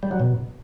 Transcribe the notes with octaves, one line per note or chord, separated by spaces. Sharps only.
G3
F#3
B2